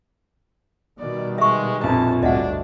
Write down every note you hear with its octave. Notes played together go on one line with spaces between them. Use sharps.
B2 D#3 G3 D5
G#3 E5 C#6
A#1 F2 A5
G1 D2 D4 D#5 E5 F#5